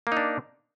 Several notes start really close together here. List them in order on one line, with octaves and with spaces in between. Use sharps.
A#3 D#4 D4